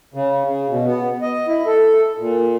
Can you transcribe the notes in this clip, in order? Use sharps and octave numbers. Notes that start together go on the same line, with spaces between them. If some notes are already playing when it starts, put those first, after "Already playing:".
C#3
C#3
B2
B3
D#5
E4
A4
A#2